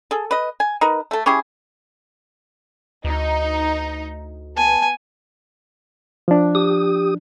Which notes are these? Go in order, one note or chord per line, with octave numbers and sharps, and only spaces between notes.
G#4 A4
B4 D#5
G#5
D#4 A#4 B4
A3 A4
C#4 E4 G4 G#4
D2 D#4
B3 G#5 A5
F3 D4
G4 D#6